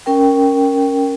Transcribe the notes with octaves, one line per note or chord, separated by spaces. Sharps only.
C#4 A#4 G5